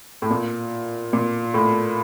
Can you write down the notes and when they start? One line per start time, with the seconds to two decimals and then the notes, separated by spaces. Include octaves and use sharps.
0.22 A2
0.31 A#2
1.13 A#2
1.54 A2